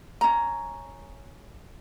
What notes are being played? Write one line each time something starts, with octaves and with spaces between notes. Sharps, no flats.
C#4 A#5